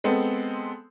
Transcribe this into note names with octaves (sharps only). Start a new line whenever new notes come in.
G#3 B3 C4 A4